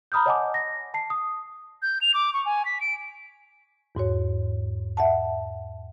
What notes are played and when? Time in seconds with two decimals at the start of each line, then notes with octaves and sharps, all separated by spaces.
0.12 A#5 B5 D#6 F6 G6
0.26 C#5 D#5 F#5 G#5 A5 D6
0.54 A#6
0.94 A5 C7
1.10 D#6
1.82 G6
2.01 F7
2.14 D6
2.34 C#6
2.45 G#5
2.65 B6
2.81 D7
3.95 E2 G#2 F#4 C#5
4.97 E5 F#5 A5